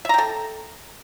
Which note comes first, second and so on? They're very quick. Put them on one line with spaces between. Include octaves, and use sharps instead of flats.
E5 A#5 G5 A4